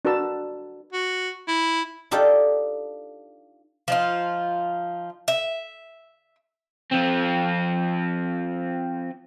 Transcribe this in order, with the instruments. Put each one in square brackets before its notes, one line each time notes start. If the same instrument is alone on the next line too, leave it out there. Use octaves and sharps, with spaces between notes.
[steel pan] D4 F#4 A#4 B4 A5 E6
[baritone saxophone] F#4
E4
[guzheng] D4 D#4 F4 G4 A4
[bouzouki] F3 D#4 F4
E5
[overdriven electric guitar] F3 C4